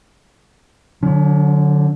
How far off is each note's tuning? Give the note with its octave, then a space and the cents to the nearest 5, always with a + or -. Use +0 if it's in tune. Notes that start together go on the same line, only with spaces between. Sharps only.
D3 +0 F#3 -25 C#4 +45